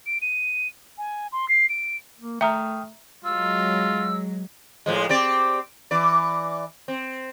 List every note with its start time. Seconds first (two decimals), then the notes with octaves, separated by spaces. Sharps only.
0.06 D7
0.22 D#7
0.98 G#5
1.32 C6
1.49 C7
1.69 D7
2.21 A#3
2.41 A3 E5 G5 A#5 D#6 F6
3.25 F#3 G#3 F4 E6
4.86 A2 F3 G#3
5.09 C4 G4 D5
5.91 E3 D5
6.88 C4